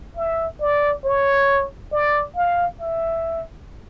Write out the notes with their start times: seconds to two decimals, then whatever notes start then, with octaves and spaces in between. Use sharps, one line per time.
0.16 E5
0.61 D5
1.04 C#5
1.92 D5
2.36 F5
2.80 E5